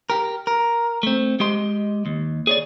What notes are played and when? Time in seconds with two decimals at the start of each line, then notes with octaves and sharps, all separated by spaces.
0.10 G4 A#4
0.47 A#4
1.03 A3 C4
1.40 G#3 G4 D#5 C6
2.06 D#2
2.47 G#4 C#5 D5